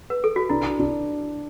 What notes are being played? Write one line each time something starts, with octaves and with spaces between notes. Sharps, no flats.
B4
A4
F#4
D4 E4
D4